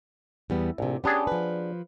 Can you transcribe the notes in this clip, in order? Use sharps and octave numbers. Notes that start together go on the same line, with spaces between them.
E2 G3 B3
A#1 A2 C3
B3 C#4 D4 G4 G#4
F3 B4